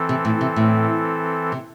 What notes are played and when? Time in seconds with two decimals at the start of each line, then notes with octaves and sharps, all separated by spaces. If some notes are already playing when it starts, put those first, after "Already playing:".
Already playing: E3 C4 A4
0.09 C3
0.25 A2
0.41 C3
0.56 A2
1.52 C3